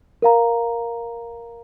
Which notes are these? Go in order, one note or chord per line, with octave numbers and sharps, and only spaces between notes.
A#4 F5 A#5